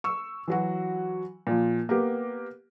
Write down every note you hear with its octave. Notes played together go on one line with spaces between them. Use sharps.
C#6 E6
E3 F#3 F#4
A#2 F3
A#3 B3 G4